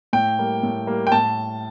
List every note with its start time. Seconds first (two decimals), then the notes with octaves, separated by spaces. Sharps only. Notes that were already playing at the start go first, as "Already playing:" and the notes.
0.13 A2 G5
0.39 G3 A#3
0.63 A2
0.87 G3 A#3
1.07 G5
1.12 A2 A5